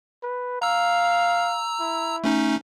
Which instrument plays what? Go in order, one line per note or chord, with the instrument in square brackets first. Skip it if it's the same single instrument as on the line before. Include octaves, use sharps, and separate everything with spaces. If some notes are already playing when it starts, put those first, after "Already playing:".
[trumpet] B4
[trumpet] F5 [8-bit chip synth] A#5 E6
[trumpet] E4
[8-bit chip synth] A3 C#4 D#4